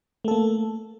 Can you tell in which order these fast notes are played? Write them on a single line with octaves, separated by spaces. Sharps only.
A3 A4 A#3